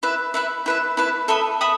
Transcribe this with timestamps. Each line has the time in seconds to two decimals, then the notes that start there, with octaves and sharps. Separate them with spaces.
0.03 E4 B4 E5
0.34 E4 B4 E5
0.66 E4 B4 E5
0.97 E4 B4 E5
1.28 A4 E5 B5 D#6
1.61 A4 E5 B5 D#6